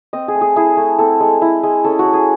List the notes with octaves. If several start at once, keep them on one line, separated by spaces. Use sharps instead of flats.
C4 D#5
G#4
A3
G#4
E4 G#4
A3
C4 A4
G#3
E4
G#3
C#4 A4
F#4
F#3
G#4